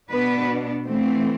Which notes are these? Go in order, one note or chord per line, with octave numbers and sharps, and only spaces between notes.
B2 B3 D4 B4
E3 A3 C4